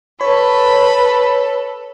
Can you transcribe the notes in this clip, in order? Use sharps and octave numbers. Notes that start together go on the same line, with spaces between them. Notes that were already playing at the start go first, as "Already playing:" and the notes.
A4 B4 C#5 B5